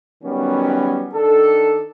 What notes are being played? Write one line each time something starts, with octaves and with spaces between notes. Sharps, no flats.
D#3 F#3 G3 B3 C#4
D#3 D4 A4